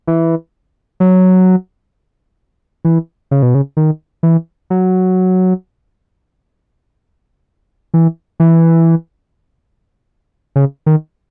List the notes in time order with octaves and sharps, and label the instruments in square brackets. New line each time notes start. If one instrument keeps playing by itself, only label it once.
[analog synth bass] E3
F#3
E3
C#3
B2
C#3
D#3
E3
F#3
E3
E3
C#3
D#3